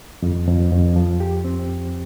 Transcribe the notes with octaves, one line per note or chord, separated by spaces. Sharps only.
F2
F2
F2
F3
G4
C4